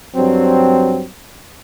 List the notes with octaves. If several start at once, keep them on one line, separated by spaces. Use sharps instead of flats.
G2 F#3 C4